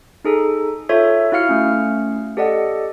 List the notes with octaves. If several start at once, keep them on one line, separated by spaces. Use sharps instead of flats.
D#4 G#4 A4
F4 A4 C#5 E5
E4 F#4 F5 F6 C#7
A3 C#4
G4 A4 D5 D#5 F#5